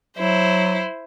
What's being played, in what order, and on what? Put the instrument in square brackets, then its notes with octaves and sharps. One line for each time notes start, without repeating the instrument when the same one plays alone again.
[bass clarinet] F#3 [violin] E4 C5